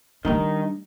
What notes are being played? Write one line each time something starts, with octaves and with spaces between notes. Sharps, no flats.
D#3 G3 D4 D#4